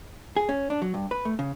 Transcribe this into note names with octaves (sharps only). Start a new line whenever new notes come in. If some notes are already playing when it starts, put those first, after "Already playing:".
G#4
C#4
D4
F#3
G2
B4
A3
C#3